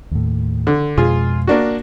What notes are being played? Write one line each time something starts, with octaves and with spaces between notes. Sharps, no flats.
D#2 A2
D3
F2 B2 G#3 F4 G#4
A#3 D4 F#4